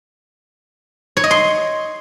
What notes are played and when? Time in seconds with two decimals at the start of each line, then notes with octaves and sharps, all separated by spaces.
1.17 C#5
1.24 D#5
1.31 C6